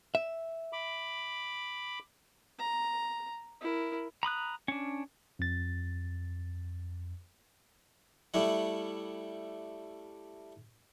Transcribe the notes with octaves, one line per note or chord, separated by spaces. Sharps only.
E5
B5 D6
A#5
E4 A#4
A#5 B5 D#6 F#6
C#4 D4
F2 A6
G3 A3 E4 F#5